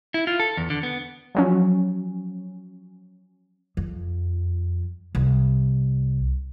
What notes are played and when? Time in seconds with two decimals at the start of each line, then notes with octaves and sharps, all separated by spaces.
0.14 E4
0.27 F4
0.40 A4
0.57 E2
0.70 D3
0.83 B3
1.35 F3 F#3 C#4
3.77 F2
5.15 C2